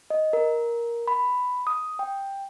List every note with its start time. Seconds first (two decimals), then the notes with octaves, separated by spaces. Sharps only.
0.10 D#5
0.33 A#4
1.07 B5
1.67 D#6
1.99 G5